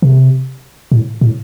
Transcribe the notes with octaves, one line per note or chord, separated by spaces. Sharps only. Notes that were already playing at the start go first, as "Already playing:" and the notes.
C3
A2
A2